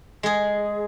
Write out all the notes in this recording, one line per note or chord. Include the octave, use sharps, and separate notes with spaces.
G#3 G#4